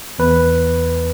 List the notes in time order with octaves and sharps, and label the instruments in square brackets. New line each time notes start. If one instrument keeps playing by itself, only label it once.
[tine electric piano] E2 B4